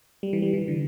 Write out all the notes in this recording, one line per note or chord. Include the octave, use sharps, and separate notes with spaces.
G3
E3
G3
E3
D3